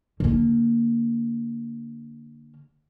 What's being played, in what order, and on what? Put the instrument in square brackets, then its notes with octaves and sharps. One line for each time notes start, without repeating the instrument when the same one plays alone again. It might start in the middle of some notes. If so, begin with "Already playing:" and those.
[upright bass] D3 A#3